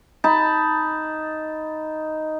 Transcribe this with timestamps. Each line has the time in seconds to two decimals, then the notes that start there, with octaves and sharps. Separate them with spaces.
0.24 D#4 A5 B5